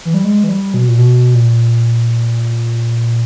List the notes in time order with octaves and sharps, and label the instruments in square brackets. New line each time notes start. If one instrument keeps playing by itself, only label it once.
[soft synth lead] E3
G3
G#3
E3
G3
B2
A#2
B2
A#2